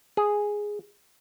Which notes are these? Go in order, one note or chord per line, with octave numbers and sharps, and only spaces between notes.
G#4